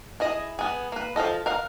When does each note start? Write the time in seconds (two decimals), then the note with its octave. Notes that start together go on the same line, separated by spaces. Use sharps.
0.20 E4 G#4 D#5
0.59 B3 G#4
0.92 A#3 B4
1.16 F3 F4 A4 D#5
1.46 A#4 F5 F#5